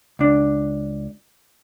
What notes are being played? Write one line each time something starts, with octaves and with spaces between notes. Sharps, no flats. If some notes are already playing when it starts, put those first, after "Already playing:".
C#2 D4